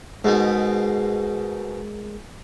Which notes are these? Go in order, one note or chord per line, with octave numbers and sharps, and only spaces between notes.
G#2 B2 G#3 D#4 G#4 A#4